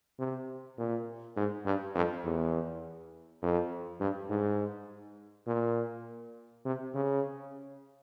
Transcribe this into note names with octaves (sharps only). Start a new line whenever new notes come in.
C3
A#2
G#2
G2
F2
E2
F2
G2
G#2
A#2
C3
C#3